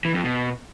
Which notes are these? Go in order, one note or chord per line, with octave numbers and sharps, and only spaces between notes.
E3
F2
B2